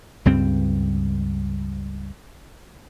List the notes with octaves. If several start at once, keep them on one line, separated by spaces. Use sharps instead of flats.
C#2 G2 C4